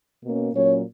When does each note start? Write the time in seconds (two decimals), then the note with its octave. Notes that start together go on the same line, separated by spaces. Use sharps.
0.22 B2 A#3 C#4
0.52 A#2 F#3 C#4 C#5